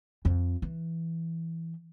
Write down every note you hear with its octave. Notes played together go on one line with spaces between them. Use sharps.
F2
E3